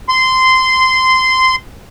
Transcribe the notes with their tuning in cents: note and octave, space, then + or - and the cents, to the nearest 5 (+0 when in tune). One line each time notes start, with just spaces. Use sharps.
C6 -15